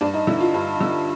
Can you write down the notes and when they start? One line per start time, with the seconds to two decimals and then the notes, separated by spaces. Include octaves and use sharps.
0.01 G2 D4
0.14 D#4
0.27 D3 E4
0.40 F4
0.54 G2
0.80 D3